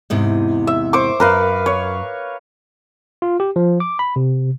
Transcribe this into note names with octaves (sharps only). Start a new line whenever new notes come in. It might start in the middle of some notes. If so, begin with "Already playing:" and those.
E2 G#2 C3
E5
C5 C#6 D6
F#2 A#4 B4 F5
C#5
F4
G4
F3
D6
B5
C3